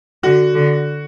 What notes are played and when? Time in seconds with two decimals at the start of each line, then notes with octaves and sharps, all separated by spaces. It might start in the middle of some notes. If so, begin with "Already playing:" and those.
0.23 D3 F#4
0.55 D3